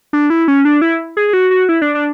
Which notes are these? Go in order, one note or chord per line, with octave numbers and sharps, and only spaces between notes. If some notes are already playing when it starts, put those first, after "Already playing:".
D4
E4
C#4
D4
E4
G#4
G#4
F#4
F#4
E4
D4
D4